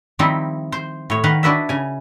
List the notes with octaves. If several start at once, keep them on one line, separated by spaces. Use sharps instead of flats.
D#3 F3 G3 C4 D#4 E4
C5
A2 C#5
D#3 B4 F5 F#5
D4 E4 F#4 B4 D#5 E5
C#3 G#5